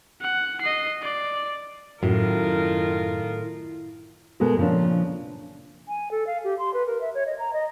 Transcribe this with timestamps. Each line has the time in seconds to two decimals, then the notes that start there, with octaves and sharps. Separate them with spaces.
0.21 F#5
0.61 D#5 C7
1.02 D5
2.03 F#2 A2 D#3 F4 A#4
4.40 B2 G#3 B3 A4 A#4
4.57 A#2 C#3 F3 C4 D4
5.88 G#5
6.11 A4
6.27 F5
6.44 G4
6.59 C6
6.74 B4
6.87 A#4
7.01 E5
7.15 C#5
7.26 D#5
7.39 A#5
7.53 D#5